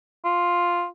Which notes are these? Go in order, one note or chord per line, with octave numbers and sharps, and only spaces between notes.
F4